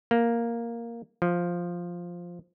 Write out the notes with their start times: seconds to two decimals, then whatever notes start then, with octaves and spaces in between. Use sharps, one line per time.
0.11 A#3
1.22 F3